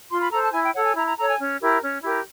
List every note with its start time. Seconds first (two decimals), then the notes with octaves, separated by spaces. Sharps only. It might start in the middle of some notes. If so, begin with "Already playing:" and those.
0.09 F4 C6
0.20 B5
0.31 A4 C5 A#5
0.42 A5
0.52 E4 G#5
0.63 G5
0.74 A4 C#5 F#5
0.84 G#5
0.95 E4 A#5
1.05 A#5
1.16 A4 C#5 A#5
1.27 G#5
1.38 C#4
1.59 E4 G4 A#4
1.81 C#4
2.02 E4 G4 A#4